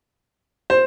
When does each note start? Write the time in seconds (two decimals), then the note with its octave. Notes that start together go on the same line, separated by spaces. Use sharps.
0.70 C5